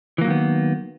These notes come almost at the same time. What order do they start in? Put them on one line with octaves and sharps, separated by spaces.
E3 A#3 F#3 D#3 B3